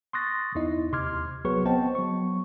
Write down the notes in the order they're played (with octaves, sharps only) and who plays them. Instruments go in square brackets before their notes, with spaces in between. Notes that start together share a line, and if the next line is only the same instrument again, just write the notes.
[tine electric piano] C6 C#6 D#6 F#6 A6 A#6
E2 D#4 E4 D#5
D#2 C3 C6 D6 F6 G#6
B1 F#3 B3 G#4 B4 C#6
B3 C4 C5 D#5 G5 A5
F#3 B3 C#6